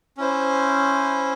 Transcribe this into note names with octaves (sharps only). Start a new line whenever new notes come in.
C#4 E4 C5